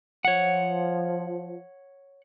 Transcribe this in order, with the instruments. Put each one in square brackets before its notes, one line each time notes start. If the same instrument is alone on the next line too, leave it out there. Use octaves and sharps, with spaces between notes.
[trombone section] F3 [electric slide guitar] C#5 F#5